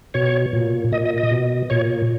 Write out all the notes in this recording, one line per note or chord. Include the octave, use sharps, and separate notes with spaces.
B2 C#5
A#2
A#2 D#5
D#5
D#5
B2
A#2 C#5